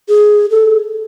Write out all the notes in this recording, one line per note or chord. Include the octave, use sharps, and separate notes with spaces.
G#4
A4